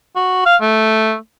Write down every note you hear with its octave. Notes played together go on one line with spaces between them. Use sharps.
F#4
F5
A3